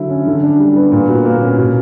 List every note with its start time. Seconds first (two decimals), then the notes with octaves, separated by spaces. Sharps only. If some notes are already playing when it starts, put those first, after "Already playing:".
Already playing: D3 F#3 E4
0.10 C#4
0.27 D3
0.43 D4
0.60 G3
0.76 B3
0.92 A#2
1.09 F#4
1.25 A#3
1.41 C#4
1.58 B2